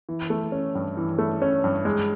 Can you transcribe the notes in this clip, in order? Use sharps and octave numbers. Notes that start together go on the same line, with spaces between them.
E3
A3
C#4
G2
E3
A3
C#4
G2
G#3